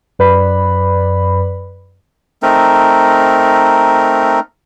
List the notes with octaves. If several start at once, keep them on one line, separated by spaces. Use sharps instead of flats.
F#2 B4 D5 B5
A3 C4 D#4 A#4